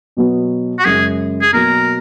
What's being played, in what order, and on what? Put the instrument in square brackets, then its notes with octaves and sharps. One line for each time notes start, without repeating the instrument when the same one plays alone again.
[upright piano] B2 F#3 B3
[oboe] F#4
[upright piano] F#2 C#3 G#3 [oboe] G#4
[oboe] G#4
[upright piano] B2 F#3 A#3 [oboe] A#4